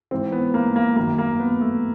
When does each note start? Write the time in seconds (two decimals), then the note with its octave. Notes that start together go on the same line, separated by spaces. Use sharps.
0.11 G#2 E3 C4
0.32 B3
0.54 A#3
0.76 A#3
0.96 F#2 D#3 A#3
1.18 A#3
1.40 B3
1.61 A3